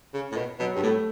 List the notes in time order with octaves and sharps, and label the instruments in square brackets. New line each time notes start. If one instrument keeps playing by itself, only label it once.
[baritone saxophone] C#3
A2
B2
[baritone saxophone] B2 [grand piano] F#3
[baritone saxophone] G2 [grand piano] G3
[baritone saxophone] A2 [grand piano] A3